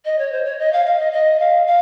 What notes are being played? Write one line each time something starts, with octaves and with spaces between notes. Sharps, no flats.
D#5
C#5
C5
C#5
D#5
F5
F5
D#5
D#5
F5
F5